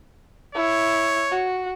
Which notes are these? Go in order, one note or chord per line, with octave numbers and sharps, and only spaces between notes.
E4 C#5
F#4